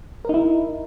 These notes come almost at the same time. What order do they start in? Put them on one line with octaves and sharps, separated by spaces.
A#4 D#4 E4